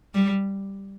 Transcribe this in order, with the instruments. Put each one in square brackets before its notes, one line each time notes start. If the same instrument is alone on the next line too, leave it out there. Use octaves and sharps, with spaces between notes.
[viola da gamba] G3